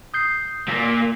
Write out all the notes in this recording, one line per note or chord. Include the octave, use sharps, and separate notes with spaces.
D#6 G6 C7
A#2 A#3 E6 A#6 B6